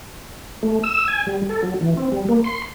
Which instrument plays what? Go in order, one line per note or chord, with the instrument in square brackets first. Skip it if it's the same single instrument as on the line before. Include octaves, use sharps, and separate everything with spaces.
[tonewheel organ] A3
E6
G#5
G3
A4
F#3
E3
C4
G3
A#3
C6